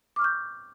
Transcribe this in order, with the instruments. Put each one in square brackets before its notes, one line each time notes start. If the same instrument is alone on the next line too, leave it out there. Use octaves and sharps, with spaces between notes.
[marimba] D6
F6
C#6
G6